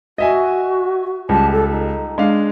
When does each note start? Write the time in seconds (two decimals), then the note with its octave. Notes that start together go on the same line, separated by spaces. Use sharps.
0.18 F#4 D#5 E5 G#5
1.29 C#2 G3 A5
1.51 A4
1.71 D#4
2.18 G#3 D4 F5